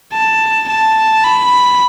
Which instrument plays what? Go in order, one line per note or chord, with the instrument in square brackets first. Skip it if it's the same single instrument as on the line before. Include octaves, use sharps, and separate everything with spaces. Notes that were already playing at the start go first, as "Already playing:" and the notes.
[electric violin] A5
A5
B5